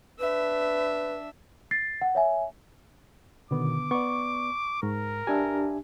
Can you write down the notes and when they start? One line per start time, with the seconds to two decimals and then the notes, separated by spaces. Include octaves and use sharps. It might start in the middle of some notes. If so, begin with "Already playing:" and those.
0.19 D4 B4 E5
1.71 A6 C7
2.01 F#5
2.15 C#5 E5 G#5
3.51 B2 D3 D#3 B3 D6
3.91 B3 D5 C#6
4.83 G#2 A#4
5.27 D4 G4 E5 G#5